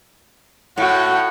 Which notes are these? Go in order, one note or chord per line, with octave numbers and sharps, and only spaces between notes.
A2 F#4